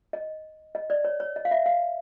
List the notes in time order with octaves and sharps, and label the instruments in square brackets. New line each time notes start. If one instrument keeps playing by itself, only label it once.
[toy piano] D#5
D#5
D5
C#5
C#5
D#5
F5
E5
F5